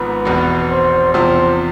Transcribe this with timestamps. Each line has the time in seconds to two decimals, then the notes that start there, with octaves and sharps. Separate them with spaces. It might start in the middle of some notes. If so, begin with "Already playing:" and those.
Already playing: G#1 G#2 F3 B3 B4
0.25 F1 E2 B2
0.70 C5
1.14 E2 C3 F3 C5